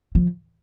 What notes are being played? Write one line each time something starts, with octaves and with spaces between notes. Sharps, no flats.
F3